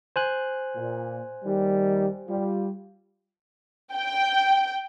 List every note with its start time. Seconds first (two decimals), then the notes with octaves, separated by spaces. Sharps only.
0.16 C5 G#5 F#6
0.76 A#2
1.45 D#2 D#3 G3
2.28 G3 F4
3.92 G5